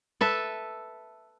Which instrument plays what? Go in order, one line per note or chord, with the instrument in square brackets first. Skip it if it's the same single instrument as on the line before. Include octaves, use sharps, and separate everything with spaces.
[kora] A4 B4 E5